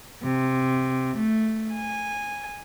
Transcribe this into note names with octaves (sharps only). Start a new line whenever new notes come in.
C3
A3
G#5